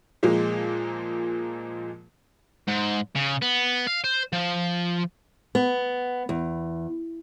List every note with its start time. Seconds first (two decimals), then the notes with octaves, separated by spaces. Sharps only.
0.23 A#2 F3 G#3 A#3
2.68 G#2
3.16 C#3
3.42 B3
3.87 F5
4.04 C5
4.33 F3
5.55 B3
6.29 E2